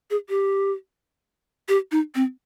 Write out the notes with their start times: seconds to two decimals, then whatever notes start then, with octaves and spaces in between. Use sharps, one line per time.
0.10 G#4
0.29 G4
1.69 G4
1.92 D#4
2.15 C4